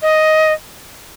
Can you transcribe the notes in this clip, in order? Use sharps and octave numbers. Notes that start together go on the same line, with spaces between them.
D#5